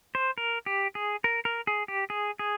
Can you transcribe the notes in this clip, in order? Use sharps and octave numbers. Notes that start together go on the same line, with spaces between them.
C5
A#4
G4
G#4
A#4
A#4
G#4
G4
G#4
G#4